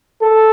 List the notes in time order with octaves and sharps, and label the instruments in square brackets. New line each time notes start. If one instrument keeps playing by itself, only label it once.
[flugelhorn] A4